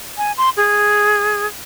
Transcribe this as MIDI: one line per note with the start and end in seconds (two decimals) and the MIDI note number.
0.18 0.32 80
0.38 0.50 84
0.57 1.46 68